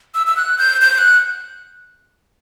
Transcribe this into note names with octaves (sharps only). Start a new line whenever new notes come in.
E6
E6
F#6
G6
G6
F#6